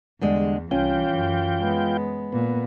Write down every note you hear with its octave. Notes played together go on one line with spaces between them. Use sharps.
E2 D3 G3 G#3
C2 E3 C#4 F4 G5
F#2
G#3 B3
A#2 B3